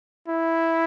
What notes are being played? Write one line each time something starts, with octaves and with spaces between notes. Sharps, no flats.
E4